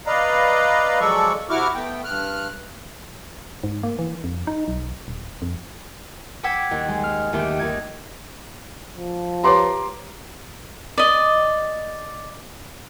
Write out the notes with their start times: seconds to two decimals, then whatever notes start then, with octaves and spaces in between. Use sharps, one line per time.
0.07 B4 D5 D#5 F5 A#5
1.00 F3 F#3 G#3 A4 D5 C#6
1.50 C3 E4 F#4 C#6 D6 F6
1.75 A3 B3 G5
2.04 G2 F6 F#6
3.64 G#2
3.83 A#3
3.99 E3
4.24 F2
4.47 D#4
4.68 B1
5.08 D#1
5.42 F2
6.43 F#5 G5 D6 E6 G#6 B6
6.71 D#2
6.89 G#3
7.04 F6
7.33 D#2 A3 G4 D7
7.59 D#2 D#4 G#6
8.96 F3
9.44 G4 B4 C#5 A#5 C6 D6
10.98 D5 D#5